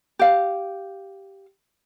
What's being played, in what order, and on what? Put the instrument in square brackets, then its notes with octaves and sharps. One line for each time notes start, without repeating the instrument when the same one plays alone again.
[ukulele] G4 F5